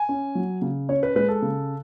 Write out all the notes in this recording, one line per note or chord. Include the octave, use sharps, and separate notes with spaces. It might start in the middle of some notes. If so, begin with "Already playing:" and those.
Already playing: G#5
C#4
F#3
C#3
C#4 C#5
B4
G#3 B4
A4
C#3